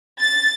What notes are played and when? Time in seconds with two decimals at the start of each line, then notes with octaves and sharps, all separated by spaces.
0.20 A6